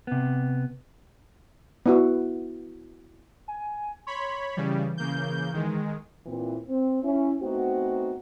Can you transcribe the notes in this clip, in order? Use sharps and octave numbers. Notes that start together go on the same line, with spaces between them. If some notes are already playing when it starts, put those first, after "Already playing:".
C3 B3
B3 E4 F#4
G#5
C#5 B5 C6
C#3 E3 G3
C#3 A#3 G6
D#3 G#3
A#2 E3 C4
C4
C#4 E4
A3 B3 C4 D#4 F#4